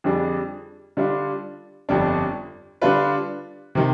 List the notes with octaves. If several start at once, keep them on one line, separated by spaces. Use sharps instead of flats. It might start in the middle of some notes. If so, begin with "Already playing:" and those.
F2 D3 G3 D4 G#4
D3 G3 D4 F4
G1 F2 D3 G3 D4
D3 G3 D4 F4 B4
C3 D#3